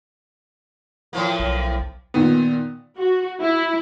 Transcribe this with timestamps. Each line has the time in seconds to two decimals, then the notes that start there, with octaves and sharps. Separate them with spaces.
1.13 A2 F3 A#3
1.39 B1
2.14 A#2 D#3 B3
2.97 F#4
3.41 E4